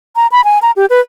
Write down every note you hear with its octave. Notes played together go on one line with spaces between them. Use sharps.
A#5
B5
G#5
A#5
G4
B4